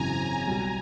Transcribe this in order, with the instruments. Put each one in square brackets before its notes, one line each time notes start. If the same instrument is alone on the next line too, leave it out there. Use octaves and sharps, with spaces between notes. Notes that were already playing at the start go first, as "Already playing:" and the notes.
Already playing: [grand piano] G#1 F#2 C#3 E3 [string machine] G#5 A#5
[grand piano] B1 B2 G3 [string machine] G#5 A#5